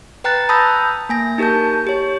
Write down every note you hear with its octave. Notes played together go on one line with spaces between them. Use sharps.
B4 G5 A#5 F#6 A6
A5 B5 D#6 E6 G6 A#6
A#3 G#5 A#6
D#4 G4 A#4 A5 G6
G4 C#5